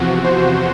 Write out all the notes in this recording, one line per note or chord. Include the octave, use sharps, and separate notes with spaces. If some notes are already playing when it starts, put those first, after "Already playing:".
Already playing: E2 C3 F3 F#4
C5